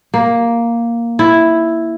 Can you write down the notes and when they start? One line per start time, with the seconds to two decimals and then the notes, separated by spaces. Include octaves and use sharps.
0.14 A#3
1.19 E4